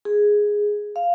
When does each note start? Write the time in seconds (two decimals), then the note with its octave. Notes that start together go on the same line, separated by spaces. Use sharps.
0.05 G#4
0.96 F5